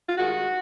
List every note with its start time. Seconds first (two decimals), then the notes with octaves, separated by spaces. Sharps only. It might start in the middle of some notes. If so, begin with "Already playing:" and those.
0.09 F4
0.18 G2 D#3 G#3 F#4